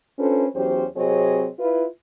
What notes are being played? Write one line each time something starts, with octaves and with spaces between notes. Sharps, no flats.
C#4 D4 F4 A4 B4 C5
E2 F#3 C#4 G4 C5
C3 F#3 C4 G#4 C#5 D#5
E4 F4 B4